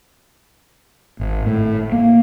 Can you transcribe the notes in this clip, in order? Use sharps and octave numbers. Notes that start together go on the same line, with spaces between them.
G#1
A2
A#3